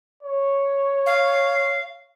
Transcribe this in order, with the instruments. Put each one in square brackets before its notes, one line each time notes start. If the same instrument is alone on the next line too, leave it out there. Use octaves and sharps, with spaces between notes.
[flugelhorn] C#5
[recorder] F5